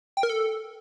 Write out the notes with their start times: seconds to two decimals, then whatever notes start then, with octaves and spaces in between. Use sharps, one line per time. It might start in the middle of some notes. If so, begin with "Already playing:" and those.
0.17 G5
0.23 A#4
0.29 A4